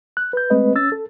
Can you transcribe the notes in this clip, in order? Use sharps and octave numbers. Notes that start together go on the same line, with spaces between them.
F#6
B4 G6
G#3 A3 C4 B4 D#5
C#4 E6 A6
A4